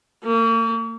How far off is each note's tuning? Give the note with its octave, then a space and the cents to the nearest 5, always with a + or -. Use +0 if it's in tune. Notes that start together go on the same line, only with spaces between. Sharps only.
A#3 -40